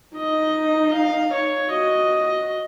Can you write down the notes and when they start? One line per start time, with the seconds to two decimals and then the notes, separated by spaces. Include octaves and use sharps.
0.16 D#4 D#5
0.94 F5
1.32 C#5
1.71 F#4 D#5